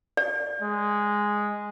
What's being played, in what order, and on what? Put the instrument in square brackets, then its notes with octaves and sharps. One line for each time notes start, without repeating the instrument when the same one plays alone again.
[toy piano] D5
[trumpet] G#3